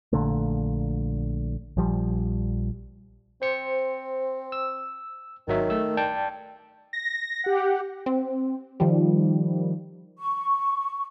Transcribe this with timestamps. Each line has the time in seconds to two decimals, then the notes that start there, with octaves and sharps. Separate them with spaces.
0.13 A#1 A#2 D3 A3
1.77 A#1 F3 G3
3.42 C4 C5 C#7
4.52 E6
5.48 G#1 D#3 F#3 E5
5.70 A3 E6
5.97 D5 G5 A5
6.93 A#6
7.44 G4 F#5
8.06 C4
8.80 D#3 F3 G3
10.18 C#6